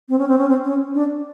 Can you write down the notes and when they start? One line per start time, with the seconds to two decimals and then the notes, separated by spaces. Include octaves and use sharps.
0.09 C4
0.19 C#4
0.28 C4
0.38 C#4
0.49 C4
0.64 C#4
0.94 D4